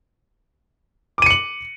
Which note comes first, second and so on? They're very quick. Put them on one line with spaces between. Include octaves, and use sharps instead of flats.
D6 D#7 C#7 F#7